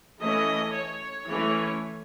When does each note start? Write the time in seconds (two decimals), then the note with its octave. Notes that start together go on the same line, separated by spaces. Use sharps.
0.20 E3 A3 C#4 D#5
0.74 C#5
1.29 E3 A3 C#4